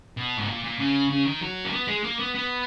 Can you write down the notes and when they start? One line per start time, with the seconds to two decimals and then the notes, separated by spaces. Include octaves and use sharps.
0.17 B2
0.37 G#2
0.48 A#2
0.64 A#2
0.79 C#3
1.10 C#3
1.26 D#3
1.42 F#3
1.65 A#3
1.72 B3
1.87 G#3
2.04 A#3
2.19 B3
2.35 B3